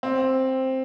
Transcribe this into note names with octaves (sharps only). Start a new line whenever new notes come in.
C4